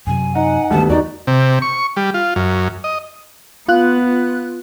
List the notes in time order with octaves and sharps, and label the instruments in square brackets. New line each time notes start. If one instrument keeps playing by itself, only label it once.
[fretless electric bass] F#2 C3 F#3 [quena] G#5
[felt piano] D#4 [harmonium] F#5
[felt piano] D2 G3 B3 [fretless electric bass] D#3 [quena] A5
[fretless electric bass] E2 [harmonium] D#3 D#4 [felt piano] F#4 [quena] D5
[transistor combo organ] C3
C#6
G3
F4
F#2
D#5
[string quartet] B3 [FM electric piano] F4 F#6